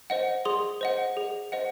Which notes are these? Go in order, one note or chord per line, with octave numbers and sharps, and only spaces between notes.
C5 D#5 F#5
G#4 C6 D#6
C5 D#5 F#5
G#4
C5 D#5 F#5